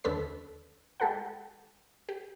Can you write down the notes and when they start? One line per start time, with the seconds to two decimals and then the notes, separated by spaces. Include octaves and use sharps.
0.04 D#2 D3 C#4 A4 B4 B6
1.00 G#3 G4 A4 B4 F#5
2.09 G4